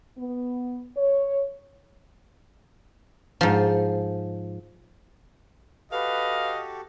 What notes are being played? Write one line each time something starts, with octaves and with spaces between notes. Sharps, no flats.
B3
C#5
G#2 F3
F#4 G4 A4 B4 D#5 F5